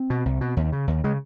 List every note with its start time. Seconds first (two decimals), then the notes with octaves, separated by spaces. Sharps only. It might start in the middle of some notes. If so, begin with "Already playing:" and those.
Already playing: C4
0.10 B2
0.25 C2
0.41 B2
0.57 D#2
0.72 C#3
0.87 D#2
1.04 C#3 G#3